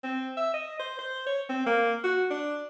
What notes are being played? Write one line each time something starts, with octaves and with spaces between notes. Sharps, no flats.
C4
E5
D#5
C5
C5
C#5
C4
A#3
F#4
D4